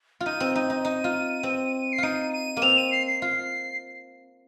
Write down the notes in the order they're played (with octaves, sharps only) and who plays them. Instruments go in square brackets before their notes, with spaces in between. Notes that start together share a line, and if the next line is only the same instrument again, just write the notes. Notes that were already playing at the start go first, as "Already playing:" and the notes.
[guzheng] F4
[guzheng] D#4 [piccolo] D#7
[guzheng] C4
[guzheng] D#4 [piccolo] D#7
[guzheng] D#4
D#4
F4
C4
[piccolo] C7
[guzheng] D#4 F4 [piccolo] D#7
[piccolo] D#7
[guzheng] A#3
[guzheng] C4 [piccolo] F7
[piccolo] D#7
C7
C7
[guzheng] F4 [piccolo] C7